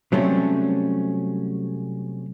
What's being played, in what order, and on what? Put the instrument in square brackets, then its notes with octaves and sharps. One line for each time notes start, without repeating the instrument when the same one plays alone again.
[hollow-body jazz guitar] C3 F#3 G3 A3 C4 C#4